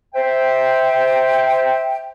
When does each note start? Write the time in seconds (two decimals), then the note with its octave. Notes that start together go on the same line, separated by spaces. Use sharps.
0.14 C5 E5 G5